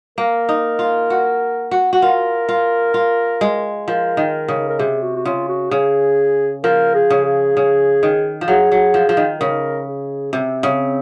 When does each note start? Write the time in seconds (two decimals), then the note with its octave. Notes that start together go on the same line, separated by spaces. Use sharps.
0.18 A#3 A#4
0.49 D#4
0.79 F4
1.10 F#4
1.71 F#4
1.93 F#4
2.02 F4 A#4
2.49 F4
2.94 F4
3.41 G#3
3.88 F3 A#4
4.17 D#3
4.48 C#3
4.69 A#4
4.79 C3 G#4
5.02 F#4
5.16 F#4
5.25 C#3 F4
5.49 F#4
5.71 C#3 G#4
6.64 F3 A#4
6.95 G#4
7.10 C#3
7.25 G#4
7.57 C#3
8.03 D#3
8.41 F3
8.48 F#3 G#4
8.72 F#3
8.94 F3
9.09 F3
9.17 D#3
9.40 C#3 A#4
9.87 G#4
10.33 C3 C4
10.63 C#3